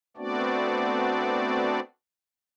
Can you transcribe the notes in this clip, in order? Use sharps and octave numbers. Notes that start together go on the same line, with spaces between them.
A3 B3 C4 D4 F#4 D5